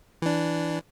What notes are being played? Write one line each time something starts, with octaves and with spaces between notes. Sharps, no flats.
E3 D4